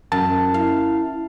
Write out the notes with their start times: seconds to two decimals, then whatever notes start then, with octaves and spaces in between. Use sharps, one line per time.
0.12 F#2 A5
0.54 E4 F5